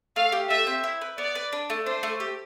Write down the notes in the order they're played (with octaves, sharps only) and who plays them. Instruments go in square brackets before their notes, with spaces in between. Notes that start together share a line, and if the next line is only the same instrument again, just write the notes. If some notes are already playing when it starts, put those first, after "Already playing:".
[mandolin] A3 [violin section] F5
[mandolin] G4
[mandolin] A3 [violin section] E5
[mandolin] C4
E4
B4
[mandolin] B3 [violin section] D5
[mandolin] B4
D4
A3
[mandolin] D4 [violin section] C5
[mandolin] A3
G4